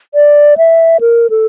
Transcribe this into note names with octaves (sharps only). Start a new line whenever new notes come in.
D5
E5
A#4
A4